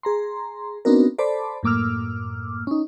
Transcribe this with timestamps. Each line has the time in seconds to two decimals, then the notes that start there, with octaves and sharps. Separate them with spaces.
0.03 G#4 A#5 C6
0.85 B3 C4 D4 D#4 F#4 A#4
1.18 A4 C5 D5 A5 B5 D6
1.63 F#2 A2 A#3 D6 E6 F6
2.67 C#4 D#4